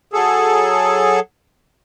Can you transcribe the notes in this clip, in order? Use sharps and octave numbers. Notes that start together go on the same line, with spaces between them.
F#3 G#4 A4